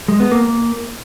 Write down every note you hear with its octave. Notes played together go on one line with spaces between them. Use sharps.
G#3
B3
A#3